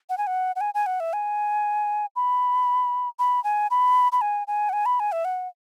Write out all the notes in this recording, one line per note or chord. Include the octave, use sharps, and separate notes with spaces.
F#5
G#5
F#5
F#5
G#5
G#5
F#5
E5
G#5
B5
B5
G#5
B5
B5
G#5
G#5
F#5
G#5
B5
G#5
E5
F#5